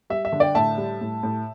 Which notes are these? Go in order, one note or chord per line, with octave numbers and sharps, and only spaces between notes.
G3 E5
E5
D3
D5 G5
A2 E5 A5
G3
A2
A2